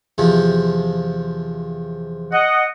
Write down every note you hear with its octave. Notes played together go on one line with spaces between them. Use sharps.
E2 C3 F3
D#5 F#5